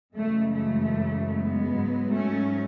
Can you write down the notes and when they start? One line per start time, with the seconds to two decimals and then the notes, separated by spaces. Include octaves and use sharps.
0.15 F#2 C#3 E3 G#3 A3
0.56 A3
1.35 G#3 B3
1.75 G#2 F#3
2.16 A3 C#4